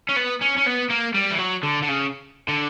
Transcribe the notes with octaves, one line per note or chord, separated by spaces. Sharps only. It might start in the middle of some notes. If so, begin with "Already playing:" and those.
C#4
B3
C#4
C#4
B3
A#3
G3
E3
F#3
D3
D3
C#3
D3